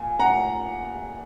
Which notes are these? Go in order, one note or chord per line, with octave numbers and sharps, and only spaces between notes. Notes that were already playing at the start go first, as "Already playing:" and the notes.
Already playing: A#2 G#5
F#5 A#5